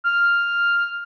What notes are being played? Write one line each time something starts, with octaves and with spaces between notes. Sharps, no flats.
F6